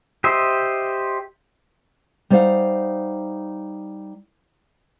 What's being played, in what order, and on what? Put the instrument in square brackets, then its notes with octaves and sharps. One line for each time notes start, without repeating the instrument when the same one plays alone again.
[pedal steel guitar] G4 C5 D#5 E5
[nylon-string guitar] G3 D#4 C5 C#5 F5 F#5